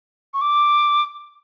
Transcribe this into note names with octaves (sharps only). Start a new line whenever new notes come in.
C#6
D6